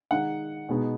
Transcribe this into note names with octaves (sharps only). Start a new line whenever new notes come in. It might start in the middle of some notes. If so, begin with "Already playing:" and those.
D#3 G#3 D#4 F#5
B2 G#3 B3 D#4